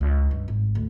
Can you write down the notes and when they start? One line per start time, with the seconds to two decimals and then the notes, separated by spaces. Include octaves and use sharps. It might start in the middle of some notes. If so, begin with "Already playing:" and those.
0.01 C#2
0.31 G2
0.48 G#1
0.75 D2